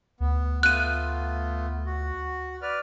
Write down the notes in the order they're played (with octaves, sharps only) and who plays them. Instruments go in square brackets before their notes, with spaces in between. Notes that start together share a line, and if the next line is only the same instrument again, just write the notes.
[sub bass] D2 [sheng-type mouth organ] B3
[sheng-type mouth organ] A3 B3 F4 [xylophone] F#6 D#7
[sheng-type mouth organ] F#4
B4 D5 F6